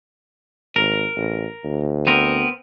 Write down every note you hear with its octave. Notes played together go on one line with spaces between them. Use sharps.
G#1 A#4
A1
D2
B3 C4 A#4